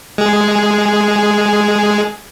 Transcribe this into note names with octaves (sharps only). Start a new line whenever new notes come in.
G#3 G#4